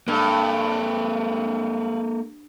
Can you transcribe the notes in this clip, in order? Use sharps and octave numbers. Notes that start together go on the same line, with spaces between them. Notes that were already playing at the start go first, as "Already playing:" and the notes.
G2 A#3 A4